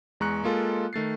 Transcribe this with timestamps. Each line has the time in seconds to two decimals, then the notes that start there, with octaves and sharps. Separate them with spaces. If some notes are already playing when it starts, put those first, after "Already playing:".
0.20 E2 G#3 A#5 C#6 F#6 C#7
0.44 G#3 A#3 F4 A4
0.93 D#3 A3 A6 C7